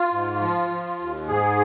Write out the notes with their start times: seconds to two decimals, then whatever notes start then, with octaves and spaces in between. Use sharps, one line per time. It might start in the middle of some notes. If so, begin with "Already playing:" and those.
Already playing: F4
0.12 G#2
0.41 F3
0.70 F3
0.99 D#2
1.28 G#2 G#4